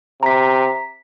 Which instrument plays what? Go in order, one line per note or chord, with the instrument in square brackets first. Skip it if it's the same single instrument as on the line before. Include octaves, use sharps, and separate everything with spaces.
[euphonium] C3 [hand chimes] A#5 B6